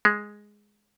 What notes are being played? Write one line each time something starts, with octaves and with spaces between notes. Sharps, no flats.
G#3